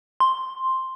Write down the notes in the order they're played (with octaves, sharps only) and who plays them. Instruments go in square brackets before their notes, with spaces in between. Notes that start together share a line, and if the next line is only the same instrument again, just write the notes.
[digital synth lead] C6